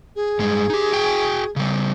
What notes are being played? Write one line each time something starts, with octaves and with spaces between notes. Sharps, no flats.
G#4
G2 G#3
D#4 G4
F#4 G5 G#5
C#3 G3